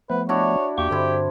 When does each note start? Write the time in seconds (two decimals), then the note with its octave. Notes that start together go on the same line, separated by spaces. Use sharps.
0.10 F3 A3 B3 B4
0.29 D4 E4 F#4 C#5
0.78 E2 A#3 G4 C#6
0.91 G2 D3 C4 E4